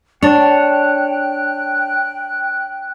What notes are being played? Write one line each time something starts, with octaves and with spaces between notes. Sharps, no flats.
D4 C#5 G5 A5 F#6